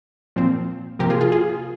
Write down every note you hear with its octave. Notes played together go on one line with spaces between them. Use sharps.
A#2 F3 C4
C3 F3 A#3 G4 A#4
F4 G#4
F4 G#4
F4 G#4